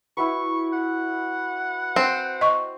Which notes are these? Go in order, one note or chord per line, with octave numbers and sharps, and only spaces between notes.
E4 F#4 B4 C#6
F#5
C4
D#5 C#6